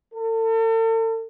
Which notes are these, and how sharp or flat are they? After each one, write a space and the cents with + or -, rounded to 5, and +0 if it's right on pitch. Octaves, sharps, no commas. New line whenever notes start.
A4 +40